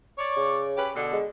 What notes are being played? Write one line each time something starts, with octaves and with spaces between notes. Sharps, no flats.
C#5 D5
C#3
C#4 G4 B4
B2 D3
G#3